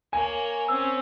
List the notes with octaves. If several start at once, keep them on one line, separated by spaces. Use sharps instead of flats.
A#3 C#5 G#5
C4 C#4 E6